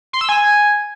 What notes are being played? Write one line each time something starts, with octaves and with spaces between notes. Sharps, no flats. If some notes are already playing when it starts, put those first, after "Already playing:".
C6
E6
G#5